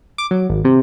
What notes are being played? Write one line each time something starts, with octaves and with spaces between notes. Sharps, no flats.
D6
F#3
G#1
C3